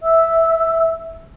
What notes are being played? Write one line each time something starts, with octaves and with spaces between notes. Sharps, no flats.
E5 E6